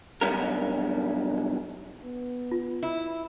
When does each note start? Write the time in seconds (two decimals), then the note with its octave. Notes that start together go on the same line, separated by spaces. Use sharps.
0.21 B1 E2 G2 C#4 A#4
2.04 B3
2.52 F4
2.83 E4